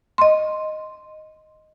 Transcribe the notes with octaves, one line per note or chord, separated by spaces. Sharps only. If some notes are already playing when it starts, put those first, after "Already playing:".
D#5 C6